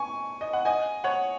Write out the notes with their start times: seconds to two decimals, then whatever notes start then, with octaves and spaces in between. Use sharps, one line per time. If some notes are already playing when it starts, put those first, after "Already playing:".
Already playing: G#5 C#6
0.41 D#5
0.53 F#5
0.65 D#5 G#5
1.04 C#5 F#5